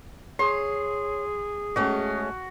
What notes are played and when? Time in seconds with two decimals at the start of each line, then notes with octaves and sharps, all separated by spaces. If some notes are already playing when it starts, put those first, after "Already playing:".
0.39 G#4 C#5 C6
1.76 G#3 A3 C#4 F#4